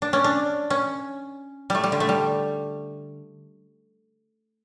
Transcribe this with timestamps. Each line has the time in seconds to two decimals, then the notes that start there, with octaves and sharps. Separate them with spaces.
0.02 D4
0.13 C#4
0.24 D4
0.70 C#4
1.70 G3 A3
1.84 G3
1.92 D3
2.00 A3
2.09 G3